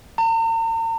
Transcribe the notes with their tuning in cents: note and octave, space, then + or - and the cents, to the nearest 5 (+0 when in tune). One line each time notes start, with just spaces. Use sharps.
A#5 -45